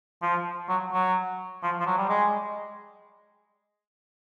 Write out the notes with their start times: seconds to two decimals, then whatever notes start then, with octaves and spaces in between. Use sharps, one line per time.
0.22 F3
0.69 F#3
0.92 F#3
1.63 F3
1.80 F3
1.86 F#3
1.98 G3
2.09 G#3